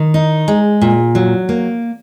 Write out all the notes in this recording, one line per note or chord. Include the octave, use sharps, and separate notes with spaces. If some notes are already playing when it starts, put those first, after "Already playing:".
Already playing: D#3
D#4
G#3
A#2
F#3
A#3